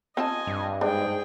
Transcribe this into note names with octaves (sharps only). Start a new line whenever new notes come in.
C4 F4 D#5 G#5 A5
G2
G#2 D4 G#4 G5